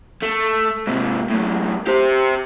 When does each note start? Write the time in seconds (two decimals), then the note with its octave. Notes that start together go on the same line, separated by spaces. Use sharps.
0.23 A3
0.87 G#2 C3
1.30 F#2 A2
1.87 G4 C5